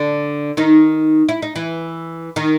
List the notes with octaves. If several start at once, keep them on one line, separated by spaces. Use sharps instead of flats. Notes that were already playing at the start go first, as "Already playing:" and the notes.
Already playing: D3 D4
D#3 D#4
E4
D#4
E3 E4
D#3 D#4